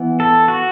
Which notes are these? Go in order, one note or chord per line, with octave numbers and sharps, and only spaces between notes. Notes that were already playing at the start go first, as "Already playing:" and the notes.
Already playing: E3 B3
A4
F#4